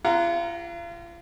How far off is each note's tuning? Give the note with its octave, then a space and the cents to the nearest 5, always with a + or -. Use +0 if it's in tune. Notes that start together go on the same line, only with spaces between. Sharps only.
F4 -40 F#5 +0 A#5 +0